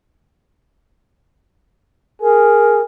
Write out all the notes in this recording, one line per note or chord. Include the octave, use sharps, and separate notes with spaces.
G#4 A#4